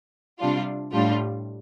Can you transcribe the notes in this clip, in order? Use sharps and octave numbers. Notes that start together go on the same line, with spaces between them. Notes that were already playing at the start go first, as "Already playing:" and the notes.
C3 G3 D4 F4
A2 G3 D4 F4